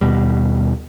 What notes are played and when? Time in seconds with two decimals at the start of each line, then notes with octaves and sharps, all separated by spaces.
0.01 D#2 B2 G3